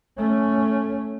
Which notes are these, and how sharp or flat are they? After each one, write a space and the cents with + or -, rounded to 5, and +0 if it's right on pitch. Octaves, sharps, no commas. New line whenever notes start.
A3 +0 C#4 +0